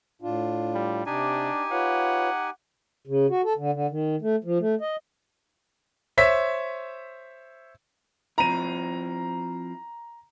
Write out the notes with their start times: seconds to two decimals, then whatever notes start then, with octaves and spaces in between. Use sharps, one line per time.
0.22 A2 D4 F4
0.75 G3
1.06 C3 D4 D#4 G4 G#5
1.72 F4 B4 C#5 F#5
3.07 C#3
3.30 F#4
3.45 A4
3.58 D3
3.73 D3
3.90 D#3
4.22 A3
4.44 F3
4.60 A3
4.81 D#5
6.18 C5 C#5 E5 B6
8.38 F3 C4 E4 A#5 D#7